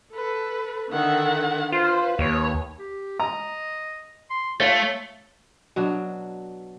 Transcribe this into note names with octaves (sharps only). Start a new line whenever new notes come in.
A4 B4
D3 D#3 E5 F#5
F4 B4 C5
D#2 C#5
G4
D#5 A#5
C6
A3 F4 C#5 F5
B2 F#3 D4